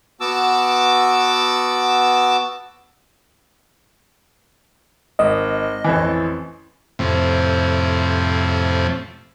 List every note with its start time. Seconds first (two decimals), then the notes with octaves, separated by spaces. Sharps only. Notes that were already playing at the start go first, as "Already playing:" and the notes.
0.21 B3 F#4 A5 D6 E6
5.19 G#1 D#5
5.84 A1 F2 E3
6.99 F2 A2 C3